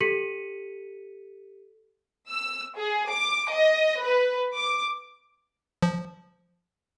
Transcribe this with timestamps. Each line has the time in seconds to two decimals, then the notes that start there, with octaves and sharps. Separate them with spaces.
0.01 G4 A4 B6 C#7 D#7 F#7
2.30 E6
2.78 G#4
3.11 D6
3.53 D#5
4.01 B4
4.55 D6
5.83 F3